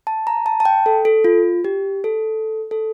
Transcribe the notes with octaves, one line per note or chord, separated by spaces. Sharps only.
A5
A#5
A5
A5
G5
A4
A4
F4
G4
A4
A4